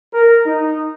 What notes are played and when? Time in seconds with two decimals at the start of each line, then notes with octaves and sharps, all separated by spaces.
0.13 A#4
0.46 D#4